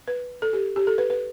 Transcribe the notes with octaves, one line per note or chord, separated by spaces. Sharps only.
B4
A4
G4
G4
A4
B4
B4